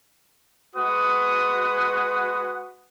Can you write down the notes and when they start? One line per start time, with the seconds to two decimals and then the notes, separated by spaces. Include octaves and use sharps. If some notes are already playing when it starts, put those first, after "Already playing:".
0.76 G#3 F#4 B4 F#5 D#6